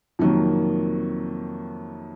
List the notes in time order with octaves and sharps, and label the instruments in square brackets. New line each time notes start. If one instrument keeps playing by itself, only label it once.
[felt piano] F2 C3 D#3 F#3 A#3